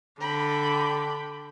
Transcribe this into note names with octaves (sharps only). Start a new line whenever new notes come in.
D3 G5 B5